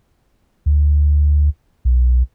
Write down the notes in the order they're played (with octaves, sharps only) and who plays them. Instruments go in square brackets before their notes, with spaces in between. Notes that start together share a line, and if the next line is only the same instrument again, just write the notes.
[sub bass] D2
B1